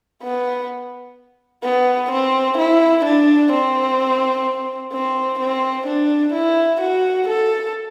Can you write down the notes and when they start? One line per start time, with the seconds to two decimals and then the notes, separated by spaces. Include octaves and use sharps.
0.23 B3
1.63 B3
2.11 C4
2.58 E4
3.04 D4
3.52 C4
4.92 C4
5.39 C4
5.86 D4
6.33 E4
6.81 F#4
7.28 A4